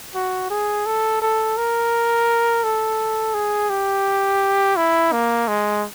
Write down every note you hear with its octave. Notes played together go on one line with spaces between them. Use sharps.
F#4
G#4
A4
A4
A#4
A4
G#4
G4
E4
A#3
G#3